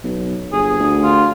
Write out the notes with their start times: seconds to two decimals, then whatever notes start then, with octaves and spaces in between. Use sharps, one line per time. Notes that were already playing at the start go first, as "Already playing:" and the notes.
0.04 B1
0.53 G1 G#4
0.80 D2
1.03 F4